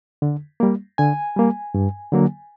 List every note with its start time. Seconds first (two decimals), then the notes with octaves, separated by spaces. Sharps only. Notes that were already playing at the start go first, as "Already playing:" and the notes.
0.22 D3
0.60 G3 A#3
0.98 D3 G#5
1.36 G3 A#3
1.74 G2
2.12 D3 F#3 A#3